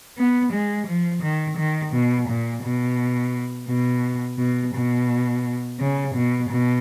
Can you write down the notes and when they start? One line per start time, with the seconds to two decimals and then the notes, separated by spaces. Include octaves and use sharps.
0.18 B3
0.53 G#3
0.87 F3
1.23 D#3
1.58 D#3
1.93 B2
2.29 A#2
2.63 B2
3.68 B2
4.39 B2
4.74 B2
5.79 C#3
6.15 B2
6.50 B2